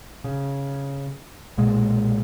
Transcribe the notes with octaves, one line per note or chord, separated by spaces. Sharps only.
C#3
B1 A#2 G#3